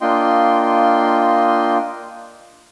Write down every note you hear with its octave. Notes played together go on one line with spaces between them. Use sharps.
A#3 D4 F4 D#5 G5 C6